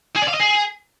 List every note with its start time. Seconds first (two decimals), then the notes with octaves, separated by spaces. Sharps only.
0.16 G#4
0.22 D5
0.28 F5
0.34 D#5
0.40 G#4